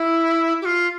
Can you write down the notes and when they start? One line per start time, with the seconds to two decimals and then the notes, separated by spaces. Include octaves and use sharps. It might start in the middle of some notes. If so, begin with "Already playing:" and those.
Already playing: E4
0.62 G4
0.65 F4